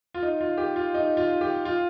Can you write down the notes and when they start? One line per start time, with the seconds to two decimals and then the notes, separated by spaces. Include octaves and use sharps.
0.14 F4
0.23 D#4
0.41 F4
0.58 G4
0.76 F4
0.94 D#4
1.17 F4
1.41 G4
1.65 F4